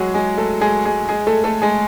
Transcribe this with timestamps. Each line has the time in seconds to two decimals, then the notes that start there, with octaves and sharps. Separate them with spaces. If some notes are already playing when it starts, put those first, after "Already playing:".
Already playing: F#3 G#3 F#4 G#4
0.14 G#3 G#4
0.38 A3 A4
0.61 G#3 G#4
0.85 G#3 G#4
1.09 G#3 G#4
1.27 A3 A4
1.44 A3 A4
1.62 G#3 G#4